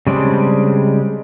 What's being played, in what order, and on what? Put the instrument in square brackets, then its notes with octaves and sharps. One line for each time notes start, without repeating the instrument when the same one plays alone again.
[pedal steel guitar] C#3 G3 G#3 C4 D4